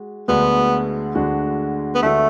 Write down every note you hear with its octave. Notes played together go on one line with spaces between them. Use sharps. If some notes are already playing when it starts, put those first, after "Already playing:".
Already playing: G#3 F#4
D2 D3 G#3 B3 D4 F#4
D2 D3 G#3 D4 F#4
B3
D2 D3 G#3 A3 D4 F#4